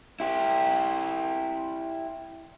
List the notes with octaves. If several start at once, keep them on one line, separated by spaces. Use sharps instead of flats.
E4 G4